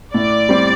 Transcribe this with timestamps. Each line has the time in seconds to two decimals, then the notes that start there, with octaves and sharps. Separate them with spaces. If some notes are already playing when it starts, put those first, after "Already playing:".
0.14 A2 D5
0.49 G3 C4